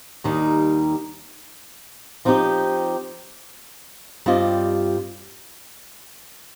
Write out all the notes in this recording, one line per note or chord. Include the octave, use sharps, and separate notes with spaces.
D#2 D#3 G3 D#4
F3 C4 D#4 G4
G2 G3 C4 F4 D#5